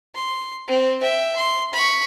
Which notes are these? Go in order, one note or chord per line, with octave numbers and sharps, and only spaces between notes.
C6
C4
E5 G5
C6
B5 C#6